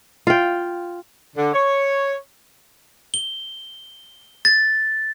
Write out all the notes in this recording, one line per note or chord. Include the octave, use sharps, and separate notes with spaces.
F4 G5
D3
C#5
G7
A6